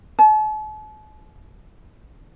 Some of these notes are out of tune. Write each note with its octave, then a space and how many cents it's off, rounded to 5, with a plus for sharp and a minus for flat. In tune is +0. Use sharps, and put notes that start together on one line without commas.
A5 -45